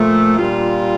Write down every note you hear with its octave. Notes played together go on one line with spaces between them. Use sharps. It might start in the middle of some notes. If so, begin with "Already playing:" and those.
Already playing: A#2 F3 A3
A#2 G3 D4 F4